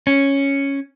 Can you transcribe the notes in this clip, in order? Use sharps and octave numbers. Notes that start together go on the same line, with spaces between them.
C#4